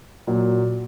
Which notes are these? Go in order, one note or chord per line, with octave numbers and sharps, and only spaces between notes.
A#2 F#3